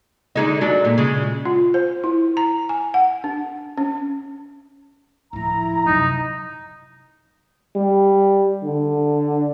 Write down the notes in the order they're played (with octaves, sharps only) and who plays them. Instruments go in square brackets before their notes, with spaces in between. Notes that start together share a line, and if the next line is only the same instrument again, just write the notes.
[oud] D3 G#3 D#4
F#3 G#3 D4
A#2
C#3 G#3
[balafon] F4
C5
E4
A#5
G#5
F#5
D4
C#4
[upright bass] D1 F3 [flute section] E4 A#5
[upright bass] F#2 C3 [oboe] D#4
[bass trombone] G3
D3